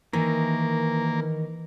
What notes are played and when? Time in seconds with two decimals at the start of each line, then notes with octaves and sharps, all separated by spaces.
0.13 D#3 E3 A#3